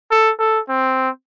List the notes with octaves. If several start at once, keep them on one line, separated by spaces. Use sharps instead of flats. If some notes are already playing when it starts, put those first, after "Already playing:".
A4
A4
C4